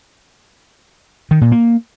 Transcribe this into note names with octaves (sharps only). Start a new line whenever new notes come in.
D#3
A#2
A#3